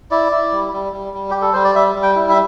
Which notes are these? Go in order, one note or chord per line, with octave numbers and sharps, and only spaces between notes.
E4 D5
E4
G3
G3
G3
G3
G3 G4
A4
G3 C5
D5
G3 E5
G3
G5
E4
E5